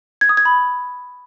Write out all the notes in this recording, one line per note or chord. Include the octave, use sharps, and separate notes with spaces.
G#6
D#6
G#6
B5